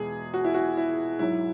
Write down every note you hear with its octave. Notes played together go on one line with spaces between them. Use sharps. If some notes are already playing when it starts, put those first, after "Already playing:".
Already playing: E2 B2 G#3 G#4
F#4
E4
F#4
E4
G#2 F#3 E4